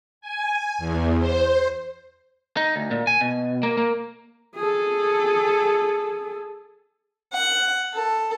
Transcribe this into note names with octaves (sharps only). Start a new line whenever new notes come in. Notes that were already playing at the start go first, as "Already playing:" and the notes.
G#5
E2
C5
D#4
D2
A#2
G#5
B2
A#3
A#3
G#4 A4
F#5
A4